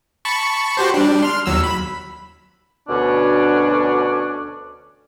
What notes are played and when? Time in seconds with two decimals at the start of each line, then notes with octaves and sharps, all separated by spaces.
0.25 A5 B5 C#6
0.77 F#4 G4 C5
0.94 G3 D4
1.23 C6 F6
1.46 D#2 F#3 E6
1.64 B5
2.88 D2 B2 D3 C#4 D4